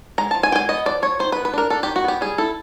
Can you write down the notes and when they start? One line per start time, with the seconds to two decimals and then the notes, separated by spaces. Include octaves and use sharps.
0.18 G#3 A#5
0.31 F3 A5
0.43 G#5
0.52 G#3 G5
0.56 G#5
0.69 B3 D#5
0.86 F3 D5
1.02 F3 C#5
1.19 D#3 C5
1.32 B4
1.36 B3
1.45 B4
1.54 D4 A#4
1.70 D4 A4
1.83 G4
1.87 D#3
1.96 F#4
2.04 B3 G4
2.21 G3 G#4
2.38 E4 A4